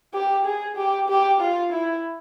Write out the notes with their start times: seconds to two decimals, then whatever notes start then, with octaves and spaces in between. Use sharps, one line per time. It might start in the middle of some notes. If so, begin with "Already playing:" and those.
0.14 G4
0.45 G#4
0.77 G4
1.09 G4
1.41 F4
1.73 E4